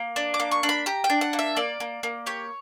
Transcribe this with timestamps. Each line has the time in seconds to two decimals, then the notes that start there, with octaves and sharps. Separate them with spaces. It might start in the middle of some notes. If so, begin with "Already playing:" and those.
Already playing: A#3
0.16 D4
0.34 D6
0.40 A#3
0.51 C#6
0.63 D4
0.69 B5
0.86 G4 A#5
1.04 G5
1.10 D4
1.21 F#5
1.33 A#3
1.39 E5
1.57 A#3 D5
1.80 A#3
2.03 A#3
2.26 G4 C#5